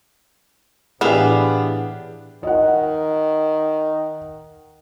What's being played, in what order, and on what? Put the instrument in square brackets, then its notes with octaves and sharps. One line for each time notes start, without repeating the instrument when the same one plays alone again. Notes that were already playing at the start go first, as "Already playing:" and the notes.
[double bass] A2 E3 [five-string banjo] B3 [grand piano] D4 G4 [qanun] G#4 E5 F5
[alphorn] D#3 [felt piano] D#5 F#5